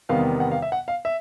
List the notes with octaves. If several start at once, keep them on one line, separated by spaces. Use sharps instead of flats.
E2 C3 D#3 G3 B3 F5
F#5
F5
E5
F#5
F5
E5